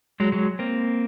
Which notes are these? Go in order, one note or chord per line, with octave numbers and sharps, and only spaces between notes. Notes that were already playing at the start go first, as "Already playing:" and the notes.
F#3 G#3
F#3 G#3
A#3 C4